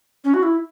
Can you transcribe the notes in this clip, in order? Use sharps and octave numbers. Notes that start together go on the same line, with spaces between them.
C#4
F#4
E4